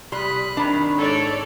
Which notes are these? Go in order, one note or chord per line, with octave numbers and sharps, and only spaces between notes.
C2 G3 B5 C6 D#6 F#6
C3 D#3 D4 B5
G#2 A4 C#5 D5